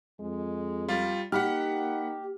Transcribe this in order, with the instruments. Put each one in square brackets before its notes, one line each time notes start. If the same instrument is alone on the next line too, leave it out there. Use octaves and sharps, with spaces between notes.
[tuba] F2 [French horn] G#3
[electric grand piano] G3 F4
[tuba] A#3 [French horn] D#4 [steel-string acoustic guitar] G4 [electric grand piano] F#5 B5 F6